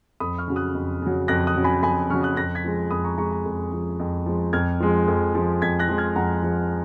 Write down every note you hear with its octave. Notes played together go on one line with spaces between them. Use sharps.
F2 B5 D#6
C#6 F6
C#3 F#3
D#6 F#6
F2
C#3 F#3
F2 F#6 A#6
D#6 F#6
C#3 F#3
G#5 B5
F2 G#5 B5
C#3 F#3 C#6 F6
D#6 F#6
F2 F#6 A#6
G#6 B6
F3 G#3
F2 B5 D#6
A#5 C#6
F3 G#3 A#5 C#6
A#5 C#6
F2
F3 G#3
F2
F3 G#3
F2 F6 G#6
F3 G#3
F2
F3 G#3
F2 G#6 B6
F#6 A#6
F3 G#3
F6 G#6
F2 F#5 A#5
F3 G#3